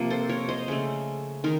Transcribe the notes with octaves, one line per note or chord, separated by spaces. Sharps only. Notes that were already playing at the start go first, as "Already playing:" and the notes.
Already playing: C3 F3 A#3
A4 C5
A#4 C#5
C5 D#5
C#3 A3
D#3 A#4